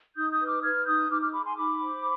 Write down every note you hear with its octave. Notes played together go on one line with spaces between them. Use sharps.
D#4 D#6 G6
D#6 G6
B4
D6 F6
B4 F6 G#6
D#4 D#6 G6
D#4 D6 F6
D6 F6
G#4 B5 D6
G#5 C6
D#4 B5 D6
C5